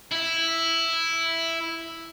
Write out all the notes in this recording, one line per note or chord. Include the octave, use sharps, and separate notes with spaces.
E4